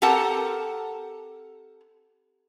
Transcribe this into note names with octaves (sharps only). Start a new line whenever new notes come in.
C4 G4 A4 A#4 F#5 A5